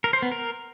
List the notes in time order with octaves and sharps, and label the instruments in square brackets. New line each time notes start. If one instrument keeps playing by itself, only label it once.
[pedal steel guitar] A#4
C5
B3
A#4